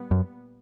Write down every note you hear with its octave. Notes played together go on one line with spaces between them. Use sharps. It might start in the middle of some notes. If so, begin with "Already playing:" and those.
Already playing: A#2 G3 B3
F#2